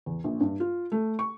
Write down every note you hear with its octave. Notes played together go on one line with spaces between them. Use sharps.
E2
A#1
G2
F4
A3
C#6